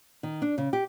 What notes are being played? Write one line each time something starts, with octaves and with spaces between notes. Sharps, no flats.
D#3
D4
C#3
G4